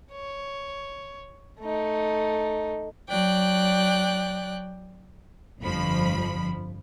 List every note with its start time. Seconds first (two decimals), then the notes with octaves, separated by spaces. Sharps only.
0.13 C#5
1.61 A3 D#4
3.09 F#3 D5 G5 F#6
5.60 G1 F2 F3 B5